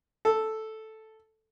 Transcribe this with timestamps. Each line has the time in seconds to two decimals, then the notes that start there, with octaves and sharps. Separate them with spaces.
0.25 A4